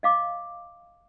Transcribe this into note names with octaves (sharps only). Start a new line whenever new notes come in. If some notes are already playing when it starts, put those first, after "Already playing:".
D#5 F5 D6